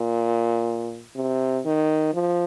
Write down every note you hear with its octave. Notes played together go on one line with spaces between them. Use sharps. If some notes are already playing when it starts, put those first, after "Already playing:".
Already playing: A#2
C3
D#3
F3